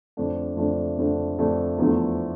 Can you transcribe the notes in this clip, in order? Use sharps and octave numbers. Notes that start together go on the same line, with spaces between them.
F2 D3 A3 D4
F2 D3 A3 D4
F2 D3 A3 D4
F2 D3 A3 D4
E2 D3 F3 A3